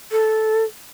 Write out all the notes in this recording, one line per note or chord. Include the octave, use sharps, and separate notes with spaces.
A4